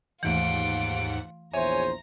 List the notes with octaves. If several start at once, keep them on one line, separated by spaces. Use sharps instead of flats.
D#2 G#2 E3 A3 F4 F#5 D7
A#1 E2 C5 C#5 E5 G#5 A#5